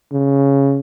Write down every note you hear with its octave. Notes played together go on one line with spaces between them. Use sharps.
C#3